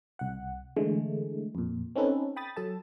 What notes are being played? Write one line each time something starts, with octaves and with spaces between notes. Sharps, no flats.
C2 F#5
D3 E3 G#3 A3
F2 A#2
C4 C#4 D#4 A4 B4
G5 B5 D#6 A6
F#3 A4 A5